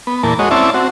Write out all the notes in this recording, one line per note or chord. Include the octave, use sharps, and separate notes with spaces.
B3
E2 A#2 A#3 A5
G#3 F#4 C#5 D#5
C4 C#4 E4 D5 E5 A5
C4 F#4